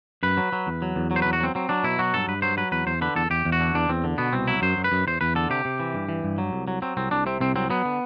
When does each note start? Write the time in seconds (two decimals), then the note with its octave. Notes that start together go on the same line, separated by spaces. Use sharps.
0.23 F#2 B4
0.37 F#3
0.52 F#3
0.67 E2
0.82 F#3
0.96 E2
1.11 F#3
1.16 C5
1.22 E2 B4
1.33 F#4
1.40 F#3 C4
1.55 F#3 C4
1.69 F#3 D4
1.84 B2 E4
1.99 F#3 F#4
2.13 G2 A4
2.28 G2 B4
2.42 F#3 C5
2.57 F#3 B4
2.72 E2 B4
2.86 E2 C5
3.01 D3 B4
3.16 E2 A4
3.30 E2 G4
3.45 E2
3.52 F#4
3.60 D3
3.74 E2 D4
3.89 E2 C4
4.04 D3
4.18 B2 B3
4.33 C2 C4
4.48 F#3 E4
4.62 F#2 C5
4.77 F#2
4.84 B4
4.92 F#2
5.07 E2 C5
5.21 E2 B4
5.35 D3 A4
5.50 C3 G4
5.65 C3
5.80 E3
5.94 G2
6.09 E3
6.23 G2
6.38 F#3
6.53 C2
6.68 F#3
6.82 F#3 C4
6.97 C2 C4
7.11 C2 D4
7.26 C3 C4
7.41 C2 C4
7.56 F#3 C4
7.70 F#3 B3
7.85 D3